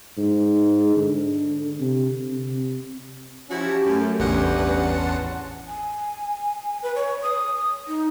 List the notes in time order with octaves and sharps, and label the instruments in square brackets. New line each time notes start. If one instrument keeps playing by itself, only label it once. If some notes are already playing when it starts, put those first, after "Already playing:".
[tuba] G#2
D3
C3
C3
[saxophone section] F3 E4 F#4 [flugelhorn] C#4 [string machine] G4 A5
[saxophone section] F#2 [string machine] A3
[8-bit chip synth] A1 E2 F#5 [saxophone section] G2 C3 [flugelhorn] C#4 [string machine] B4
[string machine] A5 C6
[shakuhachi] G#5
B4
C#5
D#6
D#4